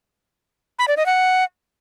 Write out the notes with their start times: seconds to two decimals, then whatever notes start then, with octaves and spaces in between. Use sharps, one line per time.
0.79 B5
0.88 D5
0.97 D#5
1.06 F#5